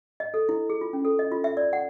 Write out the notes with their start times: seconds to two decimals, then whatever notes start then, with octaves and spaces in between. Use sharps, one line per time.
0.20 D#5
0.34 A4
0.49 E4
0.70 G#4
0.81 F4
0.93 C#4
1.05 A4
1.19 D#5
1.32 F4
1.44 E5
1.57 D5
1.73 F#5